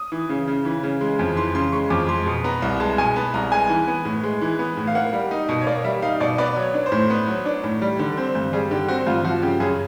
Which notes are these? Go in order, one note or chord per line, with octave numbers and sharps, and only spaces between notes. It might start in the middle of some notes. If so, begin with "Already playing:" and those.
Already playing: D#6
E3
C#3
C#3
E3
C#3
G#3
F2
E3 C6
C#3 C6
G#3 C#6
F2 D6
G#3 C6
B2
B3 A#5
C2
G#3 A5
B2 G#5
B3 A5
C2 A#5
G#3 G#5
E3
B3
A2
G#3
E3
B3
A2
F5
A#3 F#5
G3
D#4
B2
C#5
A#3 D5
G3 E5
D#4 F5
B2 D5
B3 D5
F#3
C#5
D4
C5
A2
B3
F#3
D4
A2
G3
D3
C4
G2
G3 G#4
D3 G4
C4 F#4
G2 F4
F3 F#4
C#3 G4
F#2 G#4